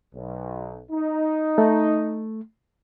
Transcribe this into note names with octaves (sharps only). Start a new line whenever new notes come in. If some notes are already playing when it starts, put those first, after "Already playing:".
B1
D#4
A3